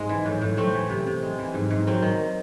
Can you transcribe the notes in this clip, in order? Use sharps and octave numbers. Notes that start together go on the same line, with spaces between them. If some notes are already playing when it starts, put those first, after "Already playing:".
Already playing: G#2 G#3 C4
E3
A2
A2
A3 C4
E3
C3
C3
G#3
E3
G#2
G#2
F#3 C4
D#3